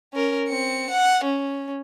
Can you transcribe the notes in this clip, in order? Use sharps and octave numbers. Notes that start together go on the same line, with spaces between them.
C#4 A#4
C4 C#7
F#5
C#4